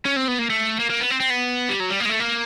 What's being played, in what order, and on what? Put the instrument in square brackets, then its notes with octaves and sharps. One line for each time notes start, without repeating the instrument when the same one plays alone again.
[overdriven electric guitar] C#4
C4
B3
A#3
A3
A#3
A#3
B3
C4
C4
B3
G3
F#3
G3
A#3
G#3
A3
A#3